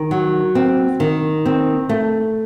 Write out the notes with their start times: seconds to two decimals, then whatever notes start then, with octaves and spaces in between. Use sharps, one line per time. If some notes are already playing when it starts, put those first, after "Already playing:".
Already playing: D#3
0.11 F#3
0.55 C4
1.00 D#3
1.46 C4
1.89 A3